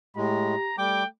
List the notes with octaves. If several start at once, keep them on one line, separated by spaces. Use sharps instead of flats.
A2 G#3 G4 A#5
G3 A3 G5 D6